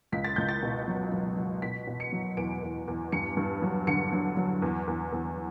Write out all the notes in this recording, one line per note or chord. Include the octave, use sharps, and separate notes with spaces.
C#2 B6
A6
C#2 G6
A6
B2
F#3
F#3
F#3
B2 B6
B2
C#7
F#3
E2 D7
E2
E2
G2 C#7
G2
F#3
D3 C#7
F#3
F#3
E2
E2
E2